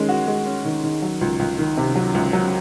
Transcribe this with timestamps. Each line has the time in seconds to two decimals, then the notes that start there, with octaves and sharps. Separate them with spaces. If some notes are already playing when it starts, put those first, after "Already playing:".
Already playing: D#3 G#3 C#4
0.09 F#4
0.27 G#3
0.46 C#4
0.65 D#3
0.83 D#3
1.02 F#3
1.21 C#2
1.39 C#2
1.58 D#3
1.77 C3
1.95 F#3
2.15 C#2
2.33 F#3